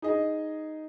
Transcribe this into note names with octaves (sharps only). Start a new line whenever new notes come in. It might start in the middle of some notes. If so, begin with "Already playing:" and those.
D#4 G#4 D#5